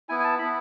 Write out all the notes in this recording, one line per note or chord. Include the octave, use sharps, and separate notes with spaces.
B3 E4 G#5
G#5
A5
B3 E4 B5